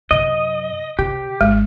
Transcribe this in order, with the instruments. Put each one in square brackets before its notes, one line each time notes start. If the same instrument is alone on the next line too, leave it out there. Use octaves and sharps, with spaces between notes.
[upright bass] F#2 C3 [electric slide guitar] D#5
[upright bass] C3 [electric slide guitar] G4
[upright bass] G#1 [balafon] G#3